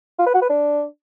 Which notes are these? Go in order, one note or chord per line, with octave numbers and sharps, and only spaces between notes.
F4
B4
F#4
B4
D4